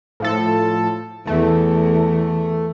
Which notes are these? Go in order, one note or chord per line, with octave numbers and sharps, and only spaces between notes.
A2 F3 A4
E2 A3